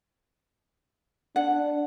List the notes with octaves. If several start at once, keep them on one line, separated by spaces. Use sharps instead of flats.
D4 F#5